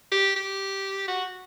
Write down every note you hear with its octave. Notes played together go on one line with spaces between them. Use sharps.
G4
G4
F#4